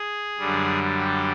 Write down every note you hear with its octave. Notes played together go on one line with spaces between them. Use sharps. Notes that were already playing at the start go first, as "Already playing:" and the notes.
Already playing: G#4
F#2 D3 G3
G4